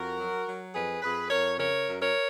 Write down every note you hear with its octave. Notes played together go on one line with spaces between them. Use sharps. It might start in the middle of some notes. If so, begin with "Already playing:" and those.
Already playing: F2 F#4 A#4
F#3
F#3
F2 G#4 B4
F2 G#4 B4
F2 A#4 C#5
C#3 A#4 C#5
F#2
A#4 C#5